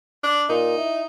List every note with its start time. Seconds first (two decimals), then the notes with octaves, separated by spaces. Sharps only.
0.24 D4
0.49 A#2 D#4
0.78 E4